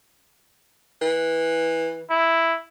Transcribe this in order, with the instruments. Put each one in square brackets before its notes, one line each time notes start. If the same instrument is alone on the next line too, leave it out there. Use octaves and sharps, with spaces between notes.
[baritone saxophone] E3
[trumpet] E4